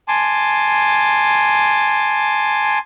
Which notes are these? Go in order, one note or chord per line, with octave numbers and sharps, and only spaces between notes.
G#5 A5 C6 D6